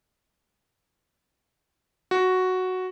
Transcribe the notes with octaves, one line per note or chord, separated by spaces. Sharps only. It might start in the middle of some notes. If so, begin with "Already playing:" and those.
F#4